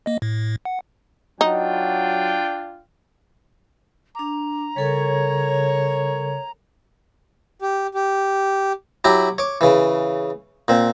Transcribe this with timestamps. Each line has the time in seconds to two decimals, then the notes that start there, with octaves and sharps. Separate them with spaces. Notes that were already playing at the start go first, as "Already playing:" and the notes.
0.06 A#3 D#5
0.22 A2
0.65 F#5
1.41 F#3 D4 D#4 F4 G5
4.15 D4 A#5 D6
4.76 C#3 G3 A4 A#4 C#5
7.62 G4
7.94 G4
9.04 F#3 E4 F#4 G4
9.38 C#5 D6
9.61 C#3 E3
10.68 A#2 C4